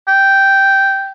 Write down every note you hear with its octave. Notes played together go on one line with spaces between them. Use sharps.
G5